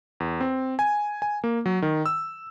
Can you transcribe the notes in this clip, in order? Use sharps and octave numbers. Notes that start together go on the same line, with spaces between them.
E2
C4
G#5
G#5
A#3
F#3
D#3
E6